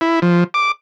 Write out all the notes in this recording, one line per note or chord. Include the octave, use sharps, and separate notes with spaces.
E4
F3
D6